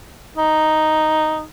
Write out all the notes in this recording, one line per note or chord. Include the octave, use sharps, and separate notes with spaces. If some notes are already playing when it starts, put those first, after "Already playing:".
D#4